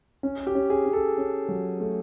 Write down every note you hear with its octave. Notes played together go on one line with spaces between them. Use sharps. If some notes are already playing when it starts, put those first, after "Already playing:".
C#4
G4
C#4
G#4
C#4
A4
C#4
F#3
A3